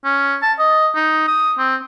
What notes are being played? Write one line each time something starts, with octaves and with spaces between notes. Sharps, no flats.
C#4
A5
D#5
D#4
D#6
C4